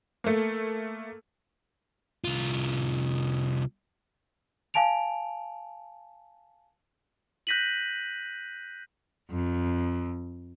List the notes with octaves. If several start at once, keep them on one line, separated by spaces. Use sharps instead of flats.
A3 A#3
C2 F4
F5 G#5 A5 D7 F7
F#6 G6 A#6 B6 D#7 F#7
F2